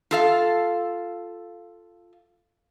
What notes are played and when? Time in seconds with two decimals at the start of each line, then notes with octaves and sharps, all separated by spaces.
0.11 F4 A4 F5